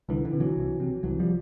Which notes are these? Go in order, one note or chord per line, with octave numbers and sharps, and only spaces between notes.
C2 D3 E3
D3 E3
C3
E3 F#3
C2
C3
C2 E3 F#3
F3 G3